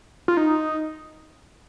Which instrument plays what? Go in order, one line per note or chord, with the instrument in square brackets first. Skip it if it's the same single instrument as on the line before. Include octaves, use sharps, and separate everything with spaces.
[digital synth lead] F4
D#4